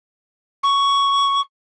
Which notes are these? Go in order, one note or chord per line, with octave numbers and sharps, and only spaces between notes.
C#6